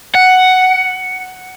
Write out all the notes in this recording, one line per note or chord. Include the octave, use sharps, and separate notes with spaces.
F#5